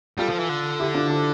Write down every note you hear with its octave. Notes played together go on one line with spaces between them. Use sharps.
G3 F4 A4
F3
E3
D3
E4 G4
D4 F4
F4 A4